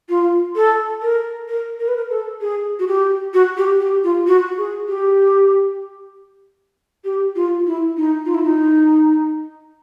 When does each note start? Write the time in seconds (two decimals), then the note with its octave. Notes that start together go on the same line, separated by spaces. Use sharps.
0.09 F4
0.56 A4
1.03 A#4
1.48 A#4
1.80 A#4
1.88 B4
1.96 A#4
2.10 A4
2.41 G#4
2.79 F#4
2.88 G4
3.34 F#4
3.57 G4
3.80 G4
4.04 F4
4.27 F#4
4.58 G#4
4.88 G4
7.05 G4
7.36 F4
7.66 E4
7.97 D#4
8.26 F4
8.34 E4
8.44 D#4